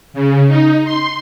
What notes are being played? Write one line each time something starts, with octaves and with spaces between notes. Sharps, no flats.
C#3
D#4
C6